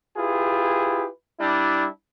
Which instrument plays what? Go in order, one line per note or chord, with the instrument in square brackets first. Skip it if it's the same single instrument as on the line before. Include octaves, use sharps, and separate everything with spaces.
[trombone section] E4 F4 G4 G#4 B4
G3 D4 E4